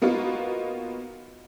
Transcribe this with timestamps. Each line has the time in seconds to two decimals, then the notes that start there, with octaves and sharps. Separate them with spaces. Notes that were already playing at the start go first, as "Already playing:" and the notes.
0.02 A#3 B3 D#4 F4 F#4